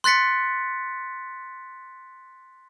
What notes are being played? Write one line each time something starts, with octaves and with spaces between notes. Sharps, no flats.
C6 F#6 A6 B6 C#7